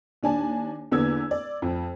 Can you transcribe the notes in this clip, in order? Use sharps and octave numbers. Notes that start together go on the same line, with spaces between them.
D#2 D4 G#5 A5
E2 D3 A#3 B3 E6 G#6
D5
F2